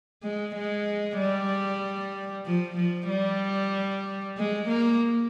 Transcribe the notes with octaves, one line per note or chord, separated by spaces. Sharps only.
G#3
G#3
G3
F3
F3
G3
G#3
A#3